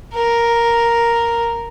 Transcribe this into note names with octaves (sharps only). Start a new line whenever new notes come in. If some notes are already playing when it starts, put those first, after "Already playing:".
A#4